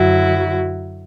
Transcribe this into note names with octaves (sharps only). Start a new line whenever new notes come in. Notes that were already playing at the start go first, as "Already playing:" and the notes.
Already playing: F#2 D3 F#3 E4 F#4